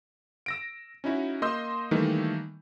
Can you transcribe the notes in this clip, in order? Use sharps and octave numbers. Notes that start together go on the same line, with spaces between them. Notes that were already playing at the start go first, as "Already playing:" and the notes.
E6 A#6 D7
C#4 D#4 E4 F#4
A#3 D#5 C6 E6 G6
D#3 E3 G3 A3 A#3 D#4